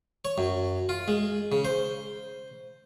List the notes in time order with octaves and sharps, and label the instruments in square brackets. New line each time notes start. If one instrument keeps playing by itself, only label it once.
[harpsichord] C#5
F#2
F4
G#3
C#3
C5